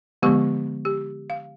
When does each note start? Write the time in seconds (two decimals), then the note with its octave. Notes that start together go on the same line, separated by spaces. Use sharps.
0.23 D3 F3 G#3 B3 G4 C#6
0.85 G4
1.30 F5